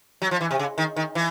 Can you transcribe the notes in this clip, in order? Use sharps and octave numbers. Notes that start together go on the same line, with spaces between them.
F#3
F3
E3
C3
C#3
D#3
D#3
E3